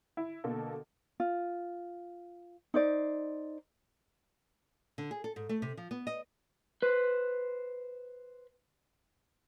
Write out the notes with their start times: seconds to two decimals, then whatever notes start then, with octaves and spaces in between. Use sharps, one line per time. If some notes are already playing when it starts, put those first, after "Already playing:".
0.17 E4
0.44 B2 D3 A#3 A4
1.20 F4
2.74 D#4 C5 D5
4.98 D3
5.11 G#4
5.24 A4
5.36 G#2
5.49 A3
5.62 C3
5.77 F3
5.91 B3
6.07 D#5
6.82 B4 C5